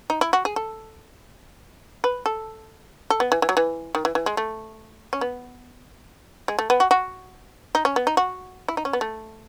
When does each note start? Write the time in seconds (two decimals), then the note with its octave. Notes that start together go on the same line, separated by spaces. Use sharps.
0.10 D#4
0.21 E4
0.33 F#4
0.45 G#4
0.56 A4
2.04 B4
2.26 A4
3.10 A4
3.20 B3
3.32 E3
3.42 E3
3.49 F#3
3.57 E3
3.95 D#3
4.05 E3
4.15 E3
4.26 G#3
4.37 A3
5.13 C#4
5.21 B3
6.48 G#3
6.59 A3
6.70 B3
6.80 F#4
6.91 F#4
7.75 D#4
7.85 C#4
7.96 B3
8.07 D#4
8.17 F#4
8.68 E4
8.77 D#4
8.85 C#4
8.93 B3
9.01 A3